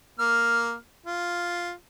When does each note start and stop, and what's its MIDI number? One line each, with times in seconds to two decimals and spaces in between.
0.19 0.75 58
0.19 0.75 89
1.06 1.72 65